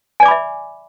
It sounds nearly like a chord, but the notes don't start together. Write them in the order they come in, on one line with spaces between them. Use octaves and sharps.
G#5 D5 D6 B5 E5